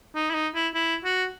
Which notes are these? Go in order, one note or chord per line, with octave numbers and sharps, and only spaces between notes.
D#4
E4
D#4
E4
E4
F#4